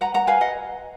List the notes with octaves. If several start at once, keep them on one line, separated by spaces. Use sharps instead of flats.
B4 F#5 A#5
F#5 A#5
B4 F5 G#5
D#5 F#5